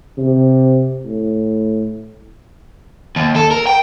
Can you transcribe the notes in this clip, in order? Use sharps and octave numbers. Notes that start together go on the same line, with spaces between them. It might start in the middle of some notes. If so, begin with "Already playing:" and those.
C3
A2
D#2
A4
A#4
G5